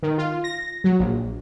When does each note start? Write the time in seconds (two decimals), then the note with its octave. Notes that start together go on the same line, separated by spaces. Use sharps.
0.03 D#3
0.18 F4
0.44 A#6
0.84 F#3
0.99 A#1